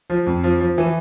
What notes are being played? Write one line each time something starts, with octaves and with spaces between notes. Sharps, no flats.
F3
F2
F3
F3
E3